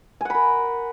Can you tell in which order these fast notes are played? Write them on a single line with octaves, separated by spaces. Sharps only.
G#5 F#5 B5 A#4